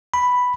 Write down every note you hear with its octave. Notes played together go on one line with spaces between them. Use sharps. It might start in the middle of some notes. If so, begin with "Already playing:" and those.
B5